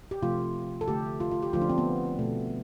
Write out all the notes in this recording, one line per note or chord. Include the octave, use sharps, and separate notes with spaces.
G4
C3 F3 A3 F4
A4
D3 A3 G4
F4
F4
G4
D3 F3 A3 F4
D4
C4
B3
B2 A3